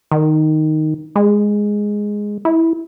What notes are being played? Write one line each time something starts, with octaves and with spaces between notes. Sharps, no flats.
D#3
G#3
E4